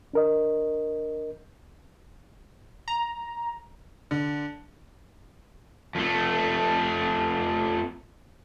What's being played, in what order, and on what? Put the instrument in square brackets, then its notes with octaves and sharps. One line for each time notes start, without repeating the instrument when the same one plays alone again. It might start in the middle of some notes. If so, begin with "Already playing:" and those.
[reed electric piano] D4 A#4 D#5
[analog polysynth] A#5
[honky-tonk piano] D3
[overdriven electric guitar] F2 A3